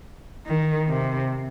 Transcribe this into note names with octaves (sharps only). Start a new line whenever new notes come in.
D#3
C3